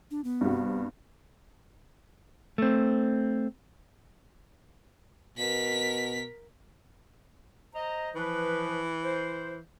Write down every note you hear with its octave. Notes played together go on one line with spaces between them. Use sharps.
D4
B3
G2 C3 F#4
A3 C4
B2 A#4 B6
C5 D#5 A#5
E3 F3 B4
C5